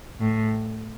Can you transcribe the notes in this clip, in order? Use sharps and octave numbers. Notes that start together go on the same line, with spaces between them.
A2